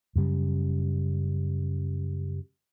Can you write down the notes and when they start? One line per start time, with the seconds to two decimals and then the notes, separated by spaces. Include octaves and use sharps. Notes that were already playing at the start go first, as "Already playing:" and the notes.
0.16 F#2 C#3 G3